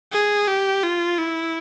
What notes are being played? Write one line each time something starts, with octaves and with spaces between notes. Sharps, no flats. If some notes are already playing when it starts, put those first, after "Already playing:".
G#4
G4
F4
E4